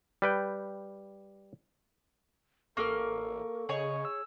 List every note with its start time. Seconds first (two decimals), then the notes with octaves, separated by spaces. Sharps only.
0.22 G3 B4 G5
2.77 A1 A#3 A4 A#4 C#6 F6
3.69 C#3 G#4 C#5 D#5
4.05 E6